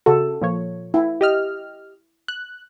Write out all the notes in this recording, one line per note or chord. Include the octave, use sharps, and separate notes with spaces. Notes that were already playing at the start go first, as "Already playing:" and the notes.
C#3 F#4 A4
A#2 F3 C#5
E4
G4 D#5 F6
F#6